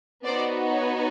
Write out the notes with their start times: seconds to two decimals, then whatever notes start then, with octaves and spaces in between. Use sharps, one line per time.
0.24 B3 D#4 F#4 C5 D5
0.74 B4 C#5